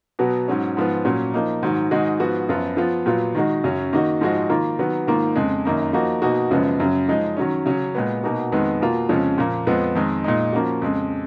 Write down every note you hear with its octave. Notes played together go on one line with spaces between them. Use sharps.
B2 F#3 B3
G#2 F#3 C#4
G#2 F3 B3
A#2 F#3 C#4
F3 A#3 D#4
G#2 D#3 F#3
G#2 D#3 G#3 D#4 F#4
G#2 F3 B3 F#4
F#2 F3 B3 F4
F3 B3 F4
A#2 F#3 B3 F4
D#3 G#3 D#4 F#4
F#2 C#3 F#3 C#4
D#3 A#3 D#4 F#4
G#2 F3 G#3 D#4 F#4
D#3 A#3 F4
D#3 F#3 B3
G#2 D#3 A#3 F4
F2 C#3 G#3
F#2 D#3 A#3 D#4
F3 A#3 D#4 F#4
B2 A#3 D#4 F#4
F#2 C#3 F3 G#3 B3
F#2 C#3 F#3
F3 G#3 D#4
D#3 F#3 C#4
C#3 F#3 C#4
A#2 G#3 B3
B2 A#3 D#4 F#4
F2 D#3 G#3 B3
B2 A#3 F4
F2 C#3 F3 G#3 C#4
A#2 F3 A#3
F2 F3 G#3 B3
F2 D#3 G#3 D#4
A#2 G#3 D#4
F3 A#3 C#4 F#4
F2 C#3 G#3